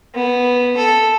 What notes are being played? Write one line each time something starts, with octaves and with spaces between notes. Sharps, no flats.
B3
A4